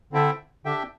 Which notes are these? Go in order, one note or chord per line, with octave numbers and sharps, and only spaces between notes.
D3 C4 E4 A4 E5 G5
D3 D4 G4 E5 G5